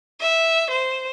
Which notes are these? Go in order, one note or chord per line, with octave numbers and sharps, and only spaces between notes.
E5
C5